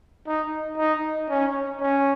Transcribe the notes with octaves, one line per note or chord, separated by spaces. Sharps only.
D#4
D#4
C#4
C#4